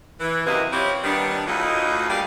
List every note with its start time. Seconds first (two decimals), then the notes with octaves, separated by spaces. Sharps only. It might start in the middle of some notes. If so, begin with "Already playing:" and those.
0.20 E3
0.47 F#2 C3 A#3 E4 B4 D#5
0.72 C4 E4 F4 G4 C#5
1.04 D#3 G3 B3 D4
1.47 D2 A2 D#4 F4 F#4 D#5
2.10 G3 A#3 D4 G#4 F5